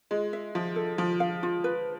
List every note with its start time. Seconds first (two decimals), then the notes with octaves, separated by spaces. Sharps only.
0.11 G#3 F4
0.33 E5
0.55 F3 F4
0.76 A4
0.98 F3 F4
1.20 F5
1.43 F4
1.64 B4